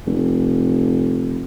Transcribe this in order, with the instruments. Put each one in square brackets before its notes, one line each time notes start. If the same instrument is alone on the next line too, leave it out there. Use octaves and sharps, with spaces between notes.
[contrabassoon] F1